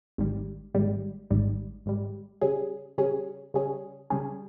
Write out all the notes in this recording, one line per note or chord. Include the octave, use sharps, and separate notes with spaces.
G#1 G#2 G3
G#1 G#2 G3
G#1 G#2 G3
G#1 G#2 G3
C#3 G3 C#4 G#4
C#3 G3 C#4 G#4
C#3 G3 C#4 G#4
C#3 G3 C#4 G#4